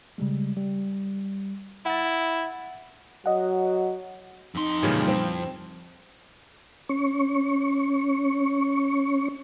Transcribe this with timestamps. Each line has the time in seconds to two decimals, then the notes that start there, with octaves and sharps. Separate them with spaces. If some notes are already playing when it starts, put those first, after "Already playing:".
0.18 C#3 G3 G#3
0.56 G3
1.86 E4 F#5 A6
3.26 F#3 D#5 F#5
4.55 F2 D#4 C6
4.82 A#2 C#3 E3 F3 G3 C#4
5.08 C4 E4
6.89 C#4 C#6